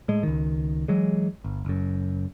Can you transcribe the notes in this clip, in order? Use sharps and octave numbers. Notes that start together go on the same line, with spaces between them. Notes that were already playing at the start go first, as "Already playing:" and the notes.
A2 G#3
C#2 D#3
E3 F#3 G#3
G1
F#1 F#2